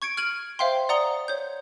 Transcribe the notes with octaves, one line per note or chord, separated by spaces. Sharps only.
C#6 G#6 C#7 D7
F6 G#6 D7 D#7 F#7
C5 E5 F5 G5 C6
D5 F#5 A#5 D#6 C#7 G7
C#5 G6